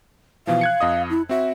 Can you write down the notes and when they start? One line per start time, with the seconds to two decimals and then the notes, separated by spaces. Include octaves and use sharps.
0.47 B2 E3 F3 F5
0.61 F#6 G#6 C#7
0.81 F2 D#5 D#6
1.10 E4
1.29 C4 F#4 E5